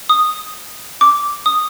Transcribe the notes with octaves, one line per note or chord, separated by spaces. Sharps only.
D#6
D6
D#6